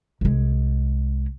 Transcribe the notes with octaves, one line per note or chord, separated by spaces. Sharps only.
C2 G#3